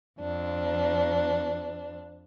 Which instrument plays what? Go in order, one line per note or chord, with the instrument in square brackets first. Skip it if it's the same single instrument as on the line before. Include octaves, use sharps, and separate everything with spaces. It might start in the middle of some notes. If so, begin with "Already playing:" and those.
[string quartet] F2 D4